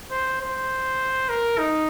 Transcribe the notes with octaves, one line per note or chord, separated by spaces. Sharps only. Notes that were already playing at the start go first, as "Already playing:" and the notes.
C5
C5
A#4
D#4